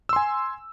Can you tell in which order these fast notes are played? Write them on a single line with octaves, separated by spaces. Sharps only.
E6 C6 G#5